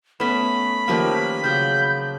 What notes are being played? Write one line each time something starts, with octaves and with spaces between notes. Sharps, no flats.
A3 B3 C#4 B5
D#3 F3 A#3 C#4 G4 B4
C#3 F#3 G6